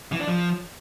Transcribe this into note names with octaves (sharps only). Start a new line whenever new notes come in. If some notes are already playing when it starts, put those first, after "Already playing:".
E3
D4
F3